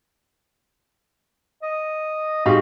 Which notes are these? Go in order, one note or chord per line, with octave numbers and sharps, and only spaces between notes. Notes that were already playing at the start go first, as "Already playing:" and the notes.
D#5
G#2 F#4 G4 F5